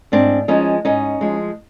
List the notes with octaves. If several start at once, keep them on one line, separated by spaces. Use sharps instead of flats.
G#2 C4 D4
F3 G#3 C#4 D#4
G#2 C#4 D#4
F3 G#3